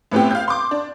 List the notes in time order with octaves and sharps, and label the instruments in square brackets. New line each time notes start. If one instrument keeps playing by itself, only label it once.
[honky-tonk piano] A2 B3 C4 G4
F5 G6
C6 D6
D4